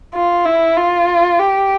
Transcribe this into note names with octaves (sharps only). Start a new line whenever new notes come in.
F4
E4
F4
G4